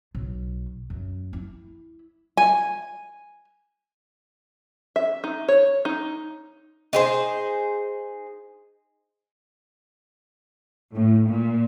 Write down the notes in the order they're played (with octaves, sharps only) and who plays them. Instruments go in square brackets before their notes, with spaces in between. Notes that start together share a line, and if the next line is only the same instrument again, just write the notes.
[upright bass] B1
F#2
E4
[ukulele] G#5
[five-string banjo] E5
D#4
C#5
D#4
[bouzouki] D#4 G#4 C5
[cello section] A2
A#2